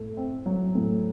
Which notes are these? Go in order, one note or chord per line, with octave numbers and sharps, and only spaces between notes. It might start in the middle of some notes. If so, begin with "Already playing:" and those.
Already playing: A2 A3
C4
F#3
A2